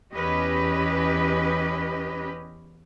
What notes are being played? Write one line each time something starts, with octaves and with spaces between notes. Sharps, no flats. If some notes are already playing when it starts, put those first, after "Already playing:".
E2 C#4 G4 B4 D#5